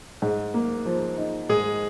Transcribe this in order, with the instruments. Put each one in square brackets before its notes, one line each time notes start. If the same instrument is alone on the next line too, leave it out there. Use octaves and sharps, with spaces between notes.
[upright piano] G#2
A#3
F3
D#4
[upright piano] G#2 [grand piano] G#3 G#4